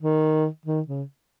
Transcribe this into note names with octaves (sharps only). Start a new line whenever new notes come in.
D#3
D#3
C#3